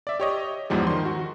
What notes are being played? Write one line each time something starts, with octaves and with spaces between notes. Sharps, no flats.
D5 E5
G4 C#5 D#5
E2 G#2 F3 G3
D#3 C6
F#4